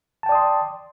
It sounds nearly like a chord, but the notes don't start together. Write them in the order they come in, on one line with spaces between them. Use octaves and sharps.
A5 G5 D5 D#6 C6